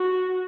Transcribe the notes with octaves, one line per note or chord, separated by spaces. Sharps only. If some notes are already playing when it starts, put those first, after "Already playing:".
Already playing: F#4